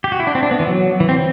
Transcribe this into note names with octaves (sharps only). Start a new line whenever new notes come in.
G4
F#4
E4
D4
C4
D4
B3
E3
F#3
E3
C4